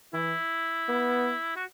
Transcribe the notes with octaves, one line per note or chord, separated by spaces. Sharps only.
E3 E4
B3
F#4